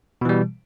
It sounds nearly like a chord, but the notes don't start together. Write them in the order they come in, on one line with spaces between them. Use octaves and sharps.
B2 E3 G3